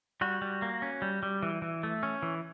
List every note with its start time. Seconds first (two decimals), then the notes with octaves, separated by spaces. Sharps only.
0.21 G3 F#4
0.42 G3
0.62 A#3
0.82 C#4
1.02 G3
1.23 G3
1.43 E3
1.62 E3
1.83 A3
2.03 C#4
2.23 E3